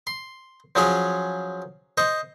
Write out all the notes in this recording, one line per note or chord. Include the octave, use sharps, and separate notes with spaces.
C6
F3 F#3 C#4 G#4 C#5
C5 D#5 C#6